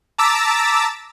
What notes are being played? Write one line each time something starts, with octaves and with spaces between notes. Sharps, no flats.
A5 A#5 D6 E6 A6 B6